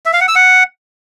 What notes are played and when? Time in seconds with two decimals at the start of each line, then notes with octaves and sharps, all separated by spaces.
0.06 E5
0.13 F5
0.21 F#5
0.28 E6
0.36 F#5